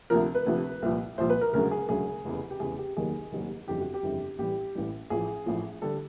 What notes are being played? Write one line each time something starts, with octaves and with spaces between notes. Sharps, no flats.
D2 C3 F3 A#4
B4
D2 C3 F3
C2 A#2 F3
C2 A#2 F3 C5
B4
A#4
E1 D2 C#3 F#3 A#4
G#4
E1 D2 C#3 F#3 G#4
F1 E2 C#3
G4
F1 E2 C#3 G#4
G4
F1 D#2 D#3 F#3 G#4
F1 D#2 D#3 F#3
G1 F2 C#3 E3 G4
F#4
G4
G1 F2 C#3 E3
A1 A2 E3 G3 G4
A1 A2 E3 G3
A1 A2 F3 G#4
A1 A2 F3
D3 G3 A4